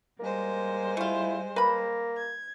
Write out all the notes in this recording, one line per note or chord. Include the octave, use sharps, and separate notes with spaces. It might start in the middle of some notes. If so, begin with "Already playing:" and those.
G3 G#3 A#3 C5
A3 E4 F4
A#3 B4 B5
G#6